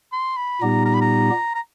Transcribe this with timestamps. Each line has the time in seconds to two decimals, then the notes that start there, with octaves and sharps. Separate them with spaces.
0.12 C6
0.37 B5
0.61 A#2 G3 B3 D#4 G4 A#5
0.85 A#5
0.94 B5
1.01 A#5
1.55 A#5